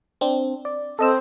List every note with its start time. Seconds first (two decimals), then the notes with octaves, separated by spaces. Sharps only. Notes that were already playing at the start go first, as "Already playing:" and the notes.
0.21 C4 D4
0.65 D5
0.99 C4 A4 D#5 E6